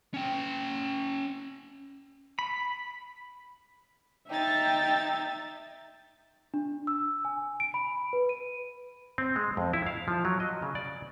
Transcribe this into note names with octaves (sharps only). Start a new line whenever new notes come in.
C#4 G5
B5
D#4 E5 G5 A6
D4
E6
G#5
G#5
D7
B5
B4
D#7
C4
G#3
F2
E4
F5
F3
F#3
D#5
C#3
D5